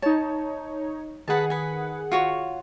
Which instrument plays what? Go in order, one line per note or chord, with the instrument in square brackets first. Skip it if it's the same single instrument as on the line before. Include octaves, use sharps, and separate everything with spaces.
[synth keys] D#4 C#5 [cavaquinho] A5
[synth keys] D#3 G#4 F#5 [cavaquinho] B4 A5
[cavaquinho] B4 G#5
F4 F#4 C#5